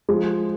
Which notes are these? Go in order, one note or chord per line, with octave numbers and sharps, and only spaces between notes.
F3 G#3